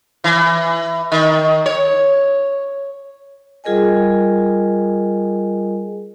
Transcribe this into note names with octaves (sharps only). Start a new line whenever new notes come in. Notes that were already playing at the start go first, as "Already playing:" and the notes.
E3
D#3
C#5
G3 F4 G#4 A#4 D#5 G#5